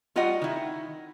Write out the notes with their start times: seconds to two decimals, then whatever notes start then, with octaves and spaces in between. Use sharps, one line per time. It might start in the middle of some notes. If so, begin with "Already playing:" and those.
0.16 G3 F4 F#4 D#5 F#5
0.42 D#3 E4